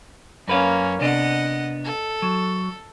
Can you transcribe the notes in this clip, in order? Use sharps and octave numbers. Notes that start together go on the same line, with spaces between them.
F#2 A#3 C#4 B4 F5
C3 B3 D4 D#5 F#5
A4
F#3